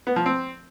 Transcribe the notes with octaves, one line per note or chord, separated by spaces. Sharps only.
B3
F3
C4